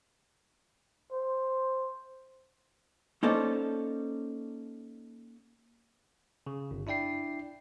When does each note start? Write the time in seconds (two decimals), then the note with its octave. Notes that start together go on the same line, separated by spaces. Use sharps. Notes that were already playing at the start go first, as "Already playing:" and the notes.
1.12 C5
3.23 A#3 C#4 D#4 A4 C5 D5
6.47 C#3
6.71 G1
6.87 D4 E4 D5 G5 C7